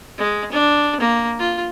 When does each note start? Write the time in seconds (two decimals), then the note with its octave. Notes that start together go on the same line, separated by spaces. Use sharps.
0.18 G#3
0.52 D4
1.00 A#3
1.39 F4